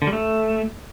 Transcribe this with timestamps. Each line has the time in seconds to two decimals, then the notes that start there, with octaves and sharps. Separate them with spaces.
0.02 D3
0.07 G3
0.13 A3